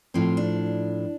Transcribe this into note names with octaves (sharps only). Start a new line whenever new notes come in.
A2 F3 C4
D4